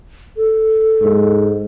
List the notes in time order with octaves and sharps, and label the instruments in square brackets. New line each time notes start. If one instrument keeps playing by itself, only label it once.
[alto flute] A4
[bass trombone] G#2